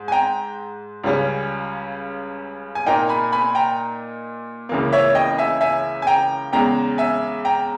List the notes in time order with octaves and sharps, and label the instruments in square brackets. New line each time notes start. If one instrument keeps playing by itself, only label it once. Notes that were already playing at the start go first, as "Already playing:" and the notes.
Already playing: [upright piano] G#2
G#5
G5 A#5
C#2 C#3 G3 C#4
G#5
A#2 A#3 D#4 G5 A#5
G#5 B5
G#5 B5
G5 A#5
C#2 C#3 E3 A#3
C#5 E5
D#5 G5
E5 G#5
E5 G#5
G#5
G5 A#5
E2 C#3 G#3 G5 A#5
E5 G#5
G5 A#5